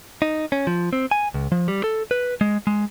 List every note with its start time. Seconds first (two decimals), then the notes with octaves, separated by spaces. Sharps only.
0.22 D#4
0.52 C#4
0.67 F3
0.93 C4
1.11 G#5
1.34 C#2
1.52 F3
1.68 G3
1.84 A4
2.11 B4
2.41 G#3
2.67 G#3